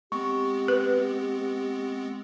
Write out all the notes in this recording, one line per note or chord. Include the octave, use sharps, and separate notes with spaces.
G#3 B3 C4 G4 C#6
B4